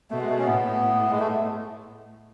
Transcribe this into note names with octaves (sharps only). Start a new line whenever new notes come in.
B2 A3
G#3
A3
C#4
A2 B3
G#3
A3